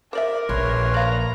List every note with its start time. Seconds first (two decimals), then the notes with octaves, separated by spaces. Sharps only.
0.13 A#4 C5 D5 E5 D6
0.49 A#1 B4 C#5 C6
0.94 D5 F5 A#5